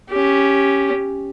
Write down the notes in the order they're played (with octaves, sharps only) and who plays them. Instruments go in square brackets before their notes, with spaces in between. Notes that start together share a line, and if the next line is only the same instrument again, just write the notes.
[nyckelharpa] C#4 G4